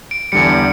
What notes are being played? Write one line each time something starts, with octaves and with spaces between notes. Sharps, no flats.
D7
E2 D3 G3 C#7